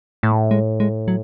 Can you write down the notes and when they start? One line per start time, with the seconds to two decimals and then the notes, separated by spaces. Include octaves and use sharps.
0.23 A2 A3
0.51 G#3
0.80 G#3
1.08 F#3